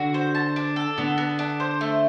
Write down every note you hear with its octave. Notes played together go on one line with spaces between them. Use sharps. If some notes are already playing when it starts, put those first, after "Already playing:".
Already playing: D3 F#4
C5
A5
D4
A4
D3 B3
B3
D4
C5
A3